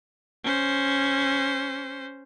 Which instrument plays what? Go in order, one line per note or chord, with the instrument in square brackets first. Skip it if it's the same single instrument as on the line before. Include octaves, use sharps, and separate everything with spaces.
[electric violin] C#4 C5